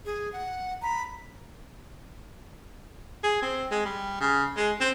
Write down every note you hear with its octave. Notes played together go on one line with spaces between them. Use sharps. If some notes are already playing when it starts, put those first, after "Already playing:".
G#4
F#5
A#5 B5
G#4
C4
G#3
G3
C#3
G#3
C4